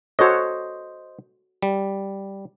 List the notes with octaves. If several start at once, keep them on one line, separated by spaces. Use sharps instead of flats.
F#4 A4 C5 C#5 D#5
G3